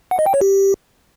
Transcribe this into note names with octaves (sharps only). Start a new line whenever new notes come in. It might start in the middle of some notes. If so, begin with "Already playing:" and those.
F#5
D#5
G5
C#5
G4